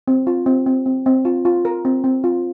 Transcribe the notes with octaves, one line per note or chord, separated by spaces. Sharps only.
C4
F4
C4
C4
C4
C4
F4
F4
A#4
C4
C4
F4